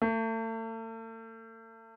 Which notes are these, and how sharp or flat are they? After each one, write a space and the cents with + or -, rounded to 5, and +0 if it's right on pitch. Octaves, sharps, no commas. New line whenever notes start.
A3 +40